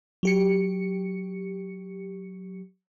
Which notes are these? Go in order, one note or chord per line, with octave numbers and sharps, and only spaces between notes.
F#3 G4 C#7